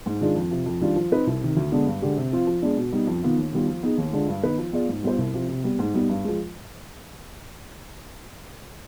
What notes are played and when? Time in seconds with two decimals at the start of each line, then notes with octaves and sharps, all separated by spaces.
0.06 G#2
0.21 D#3 G#3 D4 F4
0.36 F2
0.51 C3 F3
0.66 F2
0.81 D#3 G3 D4 F4
0.96 F3
1.11 C4 D#4 B4
1.27 C2
1.41 C3 D#3
1.57 D2
1.72 D3 G#3 B3 D4
1.86 G2
2.02 D3 G#3 D4 G4
2.17 C3
2.32 F3 C4 F4
2.47 F3
2.62 G#3 B3 D4
2.77 B2
2.92 G3 B3 D#4
3.07 F2
3.22 D#3 B3 F4
3.37 D#2
3.53 D#3 G3 B3 F4
3.68 F3
3.83 B3 D#4 G#4
3.98 D#2
4.13 D3 G#3 D4 F4
4.28 G2
4.43 D#3 B3 D#4 B4
4.58 F3
4.73 B3 F4 G#4 D5
4.89 G#2
5.03 G3 B3 F4 C5
5.18 C2
5.34 C3 F3
5.49 C3
5.64 G3 B3
5.79 G#2
5.94 G3 B3 D#4
6.09 G2
6.24 F3 G#3